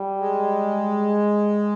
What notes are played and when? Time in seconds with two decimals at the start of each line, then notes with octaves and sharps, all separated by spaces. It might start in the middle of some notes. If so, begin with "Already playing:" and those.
Already playing: G3
0.20 G#3